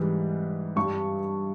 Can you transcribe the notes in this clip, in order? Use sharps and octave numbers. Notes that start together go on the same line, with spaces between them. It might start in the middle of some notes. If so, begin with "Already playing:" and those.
Already playing: G#2 E3 G3
G2 G3 C#6